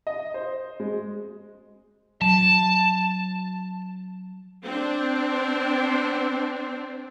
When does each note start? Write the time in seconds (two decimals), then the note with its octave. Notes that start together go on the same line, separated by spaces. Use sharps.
0.07 D#5
0.34 C5
0.80 G#3
2.22 F#3 A5
4.66 C4 D4